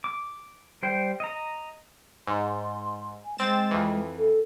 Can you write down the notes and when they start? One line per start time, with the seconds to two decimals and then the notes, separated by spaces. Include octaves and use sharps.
0.04 D6
0.83 G3 C5 G5
1.20 D#5 A#5
2.27 G#2 C6
3.25 G#5
3.38 G#3 C4 A6 E7
3.71 F2 E3
4.17 A4